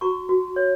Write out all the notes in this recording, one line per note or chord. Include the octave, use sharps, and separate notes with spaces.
F#4 A#5 C#6
F#4
C#5